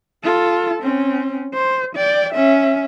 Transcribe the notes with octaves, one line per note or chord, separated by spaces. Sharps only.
F4 A4
C4 C#4
C5
D5 G5
C#4 E5